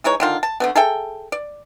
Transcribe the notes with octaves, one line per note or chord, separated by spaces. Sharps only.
E3 G#3 D#4 C#5
D3 D#3 F4
A5
D3 A3 B3
G#4 A4 E5 G5
D5